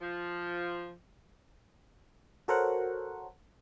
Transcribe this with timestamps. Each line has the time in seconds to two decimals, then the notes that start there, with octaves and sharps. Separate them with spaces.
0.01 F3
2.48 F#4 A4 A#4 C5 C#5 F#5